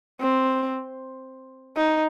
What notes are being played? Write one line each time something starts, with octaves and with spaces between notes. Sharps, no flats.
C4
D#4